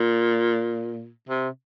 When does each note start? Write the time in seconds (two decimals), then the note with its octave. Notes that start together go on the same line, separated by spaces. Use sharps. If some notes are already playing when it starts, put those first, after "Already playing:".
Already playing: A#2
1.29 C3